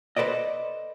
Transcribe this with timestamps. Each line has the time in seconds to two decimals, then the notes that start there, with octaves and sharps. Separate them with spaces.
0.16 A4 B4 C5 D5 D#5